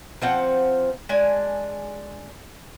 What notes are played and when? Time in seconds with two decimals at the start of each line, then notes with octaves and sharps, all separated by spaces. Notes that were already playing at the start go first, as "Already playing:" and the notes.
0.21 F3 C4 F#5 G5
1.09 G#3 D4 G#5